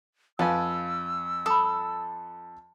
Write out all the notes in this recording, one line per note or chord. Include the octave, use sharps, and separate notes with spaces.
F2 B4 F5 G#5 A5 E6
A4 B5 D#6